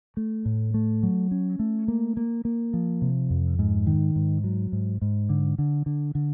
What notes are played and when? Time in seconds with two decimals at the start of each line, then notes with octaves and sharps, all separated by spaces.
0.17 A3
0.45 A2
0.74 A3
1.03 F#3
1.31 C#4
1.59 A3
1.88 A#3
2.17 A#3
2.45 A#3
2.73 F3
3.02 C3
3.30 F2
3.59 G#2
3.87 D#3
4.16 G#2
4.44 F#3
4.72 G#2
5.02 G#2
5.29 D3
5.58 D3
5.86 D3
6.15 D3